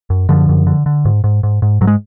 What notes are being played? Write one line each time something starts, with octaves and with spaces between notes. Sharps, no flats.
F#2
F#2 D3 F3
F#2
D3
D3
G#2
G#2
G#2
G#2
G#2 F#3
G#3